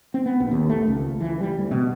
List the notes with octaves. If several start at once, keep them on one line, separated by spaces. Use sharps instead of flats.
C4
B3
A#1
D#2
A3
C#2
E3
G3
D2
B2